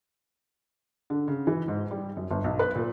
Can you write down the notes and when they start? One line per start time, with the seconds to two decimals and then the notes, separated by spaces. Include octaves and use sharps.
1.10 D3
1.28 C#3
1.47 E3
1.68 G#2
1.91 G3
2.17 F#2
2.31 G1
2.44 B1
2.59 B4
2.75 A#2